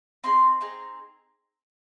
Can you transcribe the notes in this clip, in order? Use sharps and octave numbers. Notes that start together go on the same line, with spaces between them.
C4 D#4 G#4 C6
C4 D#4 G#4